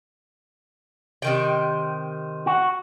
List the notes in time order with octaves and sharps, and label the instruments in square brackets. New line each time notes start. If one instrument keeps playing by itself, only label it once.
[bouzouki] C3 D#3 G5
[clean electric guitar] F#4